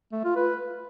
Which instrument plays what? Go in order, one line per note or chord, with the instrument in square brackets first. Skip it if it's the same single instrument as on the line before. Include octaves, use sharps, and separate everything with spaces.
[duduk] A3
F4
B4